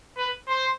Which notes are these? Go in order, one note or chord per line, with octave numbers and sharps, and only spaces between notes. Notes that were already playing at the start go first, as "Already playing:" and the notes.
B4
C5